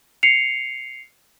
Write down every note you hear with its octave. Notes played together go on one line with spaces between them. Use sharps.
C7 C#7 F7